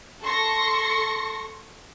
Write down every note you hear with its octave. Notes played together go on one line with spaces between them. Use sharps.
A4 C6 C#6 A#6 C#7